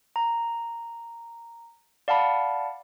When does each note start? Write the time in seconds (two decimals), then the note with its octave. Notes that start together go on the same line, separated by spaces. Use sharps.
0.16 A#5
2.08 D5 F5 F#5 A5 B5